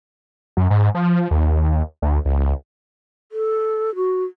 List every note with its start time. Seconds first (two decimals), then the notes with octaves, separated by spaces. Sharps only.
0.57 F#2
0.70 G#2
0.95 F3
1.31 D#2
2.02 D2
2.25 C#2
3.32 A4
3.95 F#4